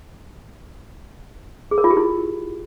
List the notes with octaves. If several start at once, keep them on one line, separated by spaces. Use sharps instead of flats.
G#4
A#4
F4
G4
E4